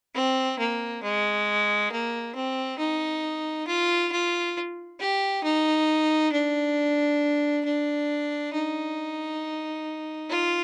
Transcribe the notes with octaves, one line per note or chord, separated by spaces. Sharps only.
C4
A#3
G#3
A#3
C4
D#4
F4
F4
G4
D#4
D4
D4
D#4
F4